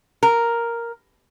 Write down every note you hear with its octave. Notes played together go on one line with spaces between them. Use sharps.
A#4